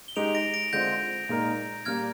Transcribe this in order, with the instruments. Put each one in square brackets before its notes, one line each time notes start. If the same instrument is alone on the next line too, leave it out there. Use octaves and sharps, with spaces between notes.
[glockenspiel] G7
[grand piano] G#3 D#4 G4 [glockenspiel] D7 F7
[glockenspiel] A#6 D7
A#6 D7
[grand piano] D3 G#3 C4 F4 [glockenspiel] G6 A#6
[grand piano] A#2 G#3 D#4 A#4
[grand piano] A#2 G3 A#3 [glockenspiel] F6 G#6